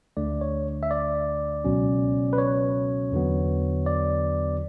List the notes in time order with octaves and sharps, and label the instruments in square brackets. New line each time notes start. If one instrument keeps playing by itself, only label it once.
[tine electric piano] D2 D3 A3 D4 D5
C#5
E5
D5
C#2 B2 F#3 C#4
B4
C#5
E2 D3 F#3 B3
D5